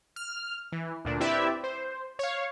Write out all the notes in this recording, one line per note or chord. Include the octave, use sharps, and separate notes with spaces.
F6
E3
D2 A#2 D4
C4 E4 G4 B4 D5 E5
C5
C#5 F5